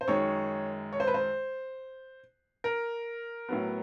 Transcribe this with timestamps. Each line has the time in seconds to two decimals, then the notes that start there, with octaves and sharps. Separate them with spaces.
0.01 C5
0.08 F#2 D#3 G#3 C#5
0.93 C#5
1.00 C5
1.07 B4
1.14 C5
2.64 A#4
3.49 A2 F#3 B3